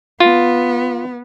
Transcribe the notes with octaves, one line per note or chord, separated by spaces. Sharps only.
B3 F4